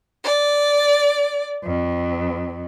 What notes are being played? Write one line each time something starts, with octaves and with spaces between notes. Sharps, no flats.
D5
F2